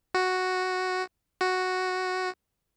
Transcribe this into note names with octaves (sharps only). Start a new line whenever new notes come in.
F#4
F#4